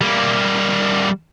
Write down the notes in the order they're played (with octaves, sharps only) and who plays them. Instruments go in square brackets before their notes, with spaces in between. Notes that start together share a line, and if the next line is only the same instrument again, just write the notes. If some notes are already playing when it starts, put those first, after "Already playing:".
[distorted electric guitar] G3 A#3